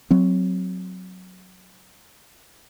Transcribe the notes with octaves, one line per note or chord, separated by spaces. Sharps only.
F#3 C4